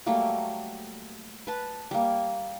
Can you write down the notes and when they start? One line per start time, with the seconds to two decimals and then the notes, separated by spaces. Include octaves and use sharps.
0.06 F#3 G3 A3 A#3
1.47 B4 A5
1.91 G3 A#3